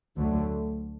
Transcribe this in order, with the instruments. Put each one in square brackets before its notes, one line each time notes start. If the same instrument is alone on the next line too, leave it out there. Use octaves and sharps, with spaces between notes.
[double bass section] D2 D3 F#3 A3